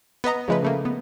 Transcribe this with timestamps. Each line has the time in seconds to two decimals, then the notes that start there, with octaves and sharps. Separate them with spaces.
0.24 B3 B4 D#5 A#5
0.48 C#3 F3 G#3 A3 B4
0.63 C#3 A3 A#3
0.85 B3